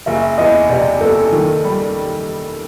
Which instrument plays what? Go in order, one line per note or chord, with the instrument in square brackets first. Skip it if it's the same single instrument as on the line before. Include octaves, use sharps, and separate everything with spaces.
[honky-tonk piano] F#1 [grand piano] E5
[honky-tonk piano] E2 [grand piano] D#5
[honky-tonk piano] C3 [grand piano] D5
[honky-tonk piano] F#1 [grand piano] A4
[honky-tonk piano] D#3
G3